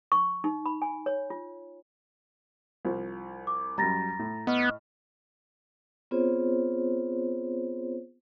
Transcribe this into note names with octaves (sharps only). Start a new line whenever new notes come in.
C#6
D#4
B5
G#5
C#5
F4
C2 F3 C5
D6
F#2 G3 A#5 A6 A#6
A2
B3 D#5 C#6 F6
B3 C4 F4 G#4 C5 C#5